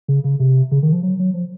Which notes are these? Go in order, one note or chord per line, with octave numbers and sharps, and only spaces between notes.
C#3
C#3
C3
C#3
D#3
F3
F#3
F#3
F3